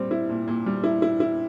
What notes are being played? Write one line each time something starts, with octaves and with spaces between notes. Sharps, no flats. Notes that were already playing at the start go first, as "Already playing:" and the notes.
Already playing: A#2 G3 C4
E4
A#2
A#2
G3
E4
E4
E4